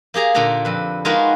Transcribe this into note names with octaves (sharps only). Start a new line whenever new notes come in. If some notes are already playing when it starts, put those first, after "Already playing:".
A#3 G4 G#4 A#5
A#2 D3 D4 G4 A#5
F2 B4
G#3 D#4 F4 F#4 A#4 B4